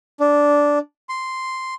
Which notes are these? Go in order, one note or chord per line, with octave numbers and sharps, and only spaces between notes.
D4
C6